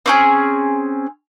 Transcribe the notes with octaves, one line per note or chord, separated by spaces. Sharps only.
C4 C#4 G#4